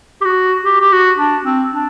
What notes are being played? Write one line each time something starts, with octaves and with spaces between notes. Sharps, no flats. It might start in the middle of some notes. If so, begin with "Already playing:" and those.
G4
F#4
G4
G4
F#4
D4
C4
D4